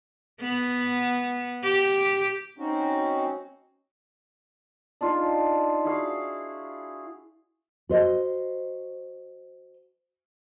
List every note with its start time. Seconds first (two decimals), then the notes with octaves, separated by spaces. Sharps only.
0.41 B3
1.64 G4
2.59 C4 C#4 D#4 F#4
5.01 D4 D#4 F4 G#4
5.85 E4 F#4 G#4 F5
7.89 F#4 C5 D#5